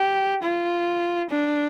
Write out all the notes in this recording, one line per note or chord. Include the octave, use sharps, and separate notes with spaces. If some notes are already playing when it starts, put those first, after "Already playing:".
Already playing: G4
F4
D4